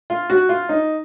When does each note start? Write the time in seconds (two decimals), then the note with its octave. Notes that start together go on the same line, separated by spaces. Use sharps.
0.10 F4
0.30 F#4
0.49 F4
0.69 D#4